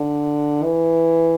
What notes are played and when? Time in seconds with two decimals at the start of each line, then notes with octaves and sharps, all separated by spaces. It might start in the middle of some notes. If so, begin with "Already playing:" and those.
Already playing: D3
0.64 E3